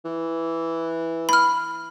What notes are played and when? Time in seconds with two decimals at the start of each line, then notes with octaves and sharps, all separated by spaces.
0.05 E3
1.29 B5 F6